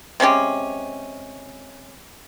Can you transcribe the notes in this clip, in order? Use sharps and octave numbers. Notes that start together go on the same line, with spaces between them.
C3 G#3 C#4 G4